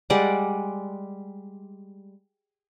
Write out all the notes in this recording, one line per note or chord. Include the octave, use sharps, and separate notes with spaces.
G3 G#3 D5 F#5